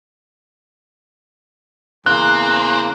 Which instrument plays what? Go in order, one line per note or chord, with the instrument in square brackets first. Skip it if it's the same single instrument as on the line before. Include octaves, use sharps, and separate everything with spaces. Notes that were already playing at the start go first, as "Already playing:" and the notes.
[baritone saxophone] E2 [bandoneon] C#3 A#3 [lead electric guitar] C4 [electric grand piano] F#6